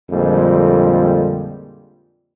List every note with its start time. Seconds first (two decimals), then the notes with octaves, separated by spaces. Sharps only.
0.10 A#1 F2 A#2 D3 G3 G#3